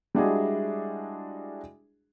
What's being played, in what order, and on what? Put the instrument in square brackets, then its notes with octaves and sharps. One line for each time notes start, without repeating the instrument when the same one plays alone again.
[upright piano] G3 G#3 D4 E4 F#4 G#4